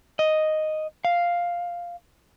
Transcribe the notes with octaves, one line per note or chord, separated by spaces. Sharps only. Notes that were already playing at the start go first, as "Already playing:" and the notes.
D#5
F5